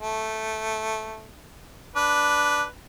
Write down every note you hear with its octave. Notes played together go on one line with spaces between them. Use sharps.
A3
D4 B4